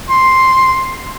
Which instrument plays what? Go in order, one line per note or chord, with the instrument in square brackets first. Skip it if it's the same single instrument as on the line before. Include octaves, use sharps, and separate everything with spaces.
[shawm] C6